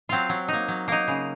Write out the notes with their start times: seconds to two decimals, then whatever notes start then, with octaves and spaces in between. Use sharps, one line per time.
0.09 F#3 C4 F4
0.29 F#3
0.48 A#3 D#4
0.68 F#3
0.88 A#3 D#4
1.08 C#3